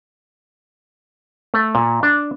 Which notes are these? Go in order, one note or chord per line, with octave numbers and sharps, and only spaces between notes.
A3
A#2
D4